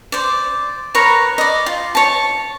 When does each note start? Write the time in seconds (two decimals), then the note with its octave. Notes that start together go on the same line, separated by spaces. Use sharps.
0.12 C5 D5
0.94 A#4 B4 C#5 A#5
1.38 D5 D#5
1.66 F4
1.95 C#5 A5